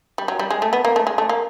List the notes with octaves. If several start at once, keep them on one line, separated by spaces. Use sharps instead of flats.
G3
F#3
G3
G#3
A3
B3
A#3
A3
G#3
A3
A#3